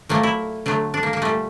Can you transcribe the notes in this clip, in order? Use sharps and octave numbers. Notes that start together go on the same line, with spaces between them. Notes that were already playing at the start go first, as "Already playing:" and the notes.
A#2 F#3 A3 A#3
E4
D3 F#3 A3
D4
A#3
A#3
A#2 G3 A3